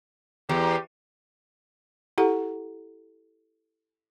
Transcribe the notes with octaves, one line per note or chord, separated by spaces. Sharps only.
E2 G4
E4 G4 A4 F#5 A#5